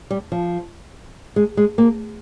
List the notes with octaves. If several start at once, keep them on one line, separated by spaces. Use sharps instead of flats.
G3
F3
G#3
G#3
A#3